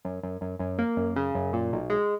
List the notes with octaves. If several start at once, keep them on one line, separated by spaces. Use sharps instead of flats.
F#2
F#2
F#2
F#2
A#3
F#2
C#3
F#2
A#2
B1
G#3